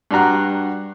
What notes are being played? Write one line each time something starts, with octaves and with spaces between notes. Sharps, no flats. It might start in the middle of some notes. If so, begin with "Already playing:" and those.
G2 D4 F#4 A#5 F#6